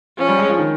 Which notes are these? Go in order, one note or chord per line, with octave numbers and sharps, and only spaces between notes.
F3 C#4
G3
G#3
F3
D#3